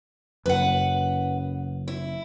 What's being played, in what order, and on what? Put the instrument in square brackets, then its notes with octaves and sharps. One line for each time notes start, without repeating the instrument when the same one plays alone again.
[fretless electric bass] F#1 F#2 [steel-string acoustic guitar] B4 F#5
[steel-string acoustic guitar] E4